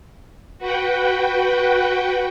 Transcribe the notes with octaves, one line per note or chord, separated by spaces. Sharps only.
F#4 B4 F#5 G5